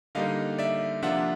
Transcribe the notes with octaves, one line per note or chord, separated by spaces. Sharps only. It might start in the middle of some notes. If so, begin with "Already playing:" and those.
D3 G3 A#3 D#4 D#5 F5
D5 E5
C3 F3 A#3 D4 F4 E5 F#5